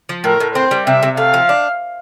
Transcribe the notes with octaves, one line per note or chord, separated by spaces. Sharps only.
F3
A2 A#4
A2
C4 C5
G3
C3 E5
C3
A3 F5
F3
D4